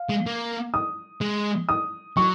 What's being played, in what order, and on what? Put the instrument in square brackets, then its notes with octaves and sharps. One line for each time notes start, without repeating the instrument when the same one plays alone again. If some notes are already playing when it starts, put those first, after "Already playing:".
Already playing: [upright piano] F5
[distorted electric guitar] G#3
A#3
[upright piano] D#6
[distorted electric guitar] G#3
[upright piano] D#6
[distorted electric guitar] F#3 [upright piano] C#6